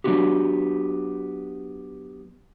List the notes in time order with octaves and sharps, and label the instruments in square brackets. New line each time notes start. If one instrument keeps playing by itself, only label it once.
[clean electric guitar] F#3 G3 B3 D4 F#4 G4